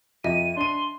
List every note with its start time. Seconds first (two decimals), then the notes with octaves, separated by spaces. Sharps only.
0.24 F2 D#5 E5 D#7
0.56 D4 C6 D#7